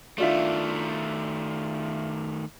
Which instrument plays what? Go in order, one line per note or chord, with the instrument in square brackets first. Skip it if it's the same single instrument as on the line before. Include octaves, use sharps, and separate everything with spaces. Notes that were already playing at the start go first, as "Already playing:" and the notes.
[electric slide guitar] D#3 A3 [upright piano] D4 F4 E5